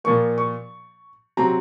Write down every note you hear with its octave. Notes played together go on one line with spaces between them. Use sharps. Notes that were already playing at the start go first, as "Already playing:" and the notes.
A#2 F3 A#3 C#6
C#6
C3 F#3 C4 A#5